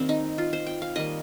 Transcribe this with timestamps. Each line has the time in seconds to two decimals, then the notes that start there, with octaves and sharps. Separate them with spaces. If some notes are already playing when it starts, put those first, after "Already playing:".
Already playing: D#3 G3 A#3 C4
0.09 D#4
0.38 F4
0.53 C5
0.67 G5
0.82 F5
0.96 D#3 G3 A#3 D#5